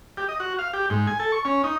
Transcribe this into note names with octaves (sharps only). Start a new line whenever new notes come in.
G4
D#5
F#4
F5
G4
G#2
G#5
A4
C#6
C#4
D#4